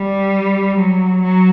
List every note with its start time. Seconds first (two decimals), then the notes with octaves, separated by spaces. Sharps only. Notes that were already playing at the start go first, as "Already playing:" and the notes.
Already playing: G3
0.78 F#3
1.22 F#3